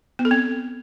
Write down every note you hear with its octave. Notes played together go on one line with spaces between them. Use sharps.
B3
A4
C4